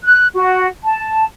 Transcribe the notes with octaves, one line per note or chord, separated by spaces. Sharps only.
F#6
F#4
A5